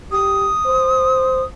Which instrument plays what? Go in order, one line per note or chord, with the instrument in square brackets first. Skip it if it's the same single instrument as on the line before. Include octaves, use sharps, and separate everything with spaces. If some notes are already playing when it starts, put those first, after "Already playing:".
[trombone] G4 [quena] D#6
[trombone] C5